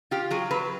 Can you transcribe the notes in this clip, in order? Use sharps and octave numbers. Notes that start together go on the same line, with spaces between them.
F4 G4
F#3 G#4
F#3 B4